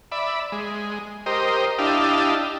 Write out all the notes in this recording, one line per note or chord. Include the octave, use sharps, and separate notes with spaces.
D5 E5 B5
G#3
G4 A#4 C5 D#5
D4 E4 G4 D#5 F5 A5